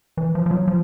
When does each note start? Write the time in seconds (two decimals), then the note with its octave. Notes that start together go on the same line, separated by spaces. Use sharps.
0.17 E3
0.35 F3
0.46 F3
0.51 F#3
0.68 F3